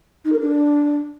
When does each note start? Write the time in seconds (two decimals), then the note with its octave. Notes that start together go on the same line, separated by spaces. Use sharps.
0.24 D#4
0.32 A#4
0.40 D4